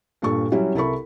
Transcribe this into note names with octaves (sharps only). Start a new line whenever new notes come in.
G2 A#2 A4 C#6
F#3 G3 C#4 E4 F#4
C2 E4 A4 A#4 B5 C#6